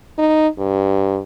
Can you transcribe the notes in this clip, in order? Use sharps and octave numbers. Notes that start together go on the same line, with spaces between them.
D#4
G2